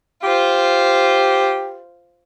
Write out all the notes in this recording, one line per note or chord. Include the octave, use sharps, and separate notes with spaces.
F4 G4 C5